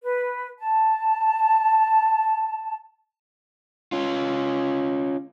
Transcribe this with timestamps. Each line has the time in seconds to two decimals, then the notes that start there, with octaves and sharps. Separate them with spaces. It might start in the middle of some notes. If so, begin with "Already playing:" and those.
0.03 B4
0.59 A5
3.92 C#4 F4